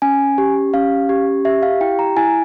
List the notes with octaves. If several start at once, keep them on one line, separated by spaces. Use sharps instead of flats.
C#4 G#5
G4
C#4 F5
G4
G4 E5
F5
E4 G5
A#5
E4 G#5